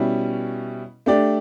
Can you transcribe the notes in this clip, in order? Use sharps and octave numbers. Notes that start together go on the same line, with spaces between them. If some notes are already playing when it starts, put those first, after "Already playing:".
Already playing: B2 G3 C#4 E4
A3 D4 G4 D5